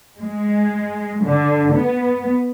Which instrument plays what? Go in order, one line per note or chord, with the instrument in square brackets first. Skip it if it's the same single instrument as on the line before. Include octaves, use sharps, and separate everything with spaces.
[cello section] G#3
D3
B3